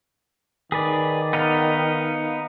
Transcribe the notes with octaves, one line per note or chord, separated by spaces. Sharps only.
D#3 G#4 B4 D5
B3 D#4 F5